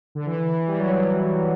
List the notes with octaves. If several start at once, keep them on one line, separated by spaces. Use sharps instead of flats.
D3
E3
E3
G3
F#3